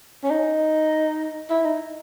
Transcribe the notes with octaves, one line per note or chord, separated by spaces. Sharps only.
C#4
D#4
E4
D#4